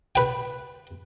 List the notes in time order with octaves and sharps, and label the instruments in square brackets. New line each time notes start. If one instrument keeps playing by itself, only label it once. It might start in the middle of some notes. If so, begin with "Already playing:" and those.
[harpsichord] B4 G5